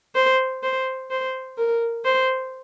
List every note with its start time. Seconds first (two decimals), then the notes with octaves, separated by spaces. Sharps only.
0.15 C5
0.63 C5
1.11 C5
1.58 A#4
2.05 C5